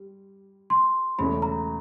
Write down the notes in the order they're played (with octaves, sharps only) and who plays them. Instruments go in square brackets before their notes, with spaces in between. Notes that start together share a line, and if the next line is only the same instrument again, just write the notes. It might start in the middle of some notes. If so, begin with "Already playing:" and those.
Already playing: [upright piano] G3
[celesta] C6
[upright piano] E1 E2 C#3 E3 A3 [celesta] B5
[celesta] A#5